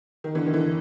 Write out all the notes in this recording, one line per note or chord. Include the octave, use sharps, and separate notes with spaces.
D#3
D3 E3
D#3
D3 E3